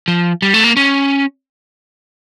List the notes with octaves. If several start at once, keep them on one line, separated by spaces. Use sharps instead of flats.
F3
G3
A3
A#3
C#4